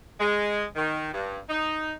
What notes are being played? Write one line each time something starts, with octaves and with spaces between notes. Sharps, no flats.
G#3
D#3
G2
D#4